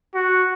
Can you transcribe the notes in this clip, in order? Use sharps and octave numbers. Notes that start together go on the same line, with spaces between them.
F#4